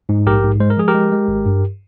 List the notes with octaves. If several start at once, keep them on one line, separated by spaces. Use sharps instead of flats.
G#2
A#1 G4 A#4
G#2
G#3 C5
A#4
F3 G#4
G4 A#4
G#3
G#3
G#1
G2